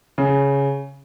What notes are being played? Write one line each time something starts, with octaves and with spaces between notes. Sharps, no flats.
C#3